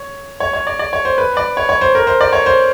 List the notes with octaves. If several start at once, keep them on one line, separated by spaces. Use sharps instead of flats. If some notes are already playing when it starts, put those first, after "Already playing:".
Already playing: C#5
C#5
C#5
D5
D5
C#5
C5
B4
D5
C#5
C#5
C5
A#4
C5
D5
C#5
C5